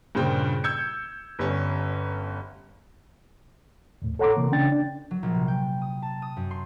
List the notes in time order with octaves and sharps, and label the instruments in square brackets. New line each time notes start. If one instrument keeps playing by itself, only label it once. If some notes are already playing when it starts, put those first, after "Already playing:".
[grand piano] G2 A#2 C#3 C5 G5
E6 G6 G#6 C#7
G1 G3 C#4
[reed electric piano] D#2 A2
A4 C#5 F#5 A#5 C6 D6
C3 E3 A#3
C#3 C#4 D4 G5 A6
D4
[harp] F#3
A#1
C3
G5
D#6
A5
D#6
F#2
C6